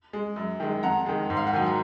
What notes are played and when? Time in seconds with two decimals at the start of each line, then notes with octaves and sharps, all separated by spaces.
0.13 G#3
0.36 F#2
0.60 D#3 G#3
0.83 F2 F#5 A#5
1.06 D#3 G#3
1.30 G#2
1.37 F5
1.47 F#5
1.53 D#3 F#3 G#5
1.66 A#5